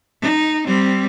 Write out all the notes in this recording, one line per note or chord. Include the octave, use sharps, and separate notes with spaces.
D#4
G3 C4